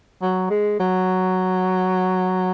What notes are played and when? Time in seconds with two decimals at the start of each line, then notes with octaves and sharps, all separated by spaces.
0.22 F#3
0.50 G#3
0.80 F#3